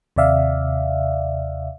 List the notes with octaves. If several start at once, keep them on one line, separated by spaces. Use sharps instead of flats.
D#2 C3 D5 E5 F5